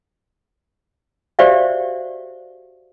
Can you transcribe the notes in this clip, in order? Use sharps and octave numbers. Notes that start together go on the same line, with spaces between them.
F#4 G4 C5 D5 E5 F5